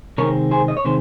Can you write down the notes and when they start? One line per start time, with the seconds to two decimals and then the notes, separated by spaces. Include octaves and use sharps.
0.18 C3 D#3 G#3 C4 A#4 C#5
0.51 G#4 C5
0.68 D#5
0.77 C#5
0.85 C3 D#3 G#3 C5